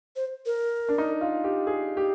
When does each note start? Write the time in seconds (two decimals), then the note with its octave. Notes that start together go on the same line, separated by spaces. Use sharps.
0.16 C5
0.46 A#4
0.89 D4
0.98 D#4
1.21 F4
1.44 G4
1.67 G#4
1.97 G4